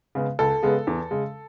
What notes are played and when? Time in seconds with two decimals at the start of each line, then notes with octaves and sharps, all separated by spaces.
0.15 C#3 G#3 B3
0.39 C#2 A4
0.63 C#3 G#3 B3
0.87 E2
1.11 C#3 G#3